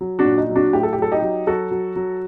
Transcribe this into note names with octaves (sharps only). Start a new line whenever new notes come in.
F#3
D4 F#4
A#2
D#4
F#3
D4 F#4
A2 G4
A4
G4
F#3 A4
D#4 G4
F#3
F#3 F#4 A4
F#3
F#3